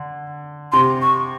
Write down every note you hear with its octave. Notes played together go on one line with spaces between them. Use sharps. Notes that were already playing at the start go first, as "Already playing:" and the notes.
Already playing: D3
C3 C6
C#6